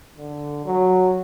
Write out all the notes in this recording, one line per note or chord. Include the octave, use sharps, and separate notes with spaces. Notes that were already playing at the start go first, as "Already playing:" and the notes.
D3
F#3